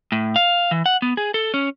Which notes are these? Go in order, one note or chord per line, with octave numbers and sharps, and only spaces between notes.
A2
F5
E3
F#5
B3
G#4
A4
C#4